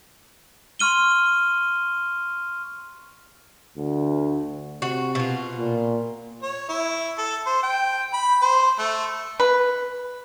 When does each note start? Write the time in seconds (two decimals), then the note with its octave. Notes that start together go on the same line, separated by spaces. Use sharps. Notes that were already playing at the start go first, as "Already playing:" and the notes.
0.79 C6 C#6 F6 D#7 G7
3.77 D2
4.82 C3 F#4
5.15 B2 F4
5.58 A#2
6.43 C#5
6.69 E4
7.18 A4
7.46 C5
7.63 G5
8.13 B5
8.41 C5
8.79 A3
9.40 B4